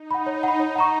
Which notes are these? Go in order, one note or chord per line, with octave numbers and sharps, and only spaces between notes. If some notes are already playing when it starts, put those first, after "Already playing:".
Already playing: D#4
F#5 B5
C#5
F#5 B5
D#4 C#5
F#5 A#5 C#6